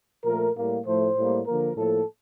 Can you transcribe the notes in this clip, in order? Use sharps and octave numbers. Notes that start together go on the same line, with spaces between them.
A#2 F3 A3 A#4
A2 G3 A#3
A2 F3 A3 C5
A2 G3 A#3
D3 F3 A#3 A#4
A2 F3 A#3 A4